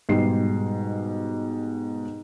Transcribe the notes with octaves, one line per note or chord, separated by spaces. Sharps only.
G#2 B2 G3 C7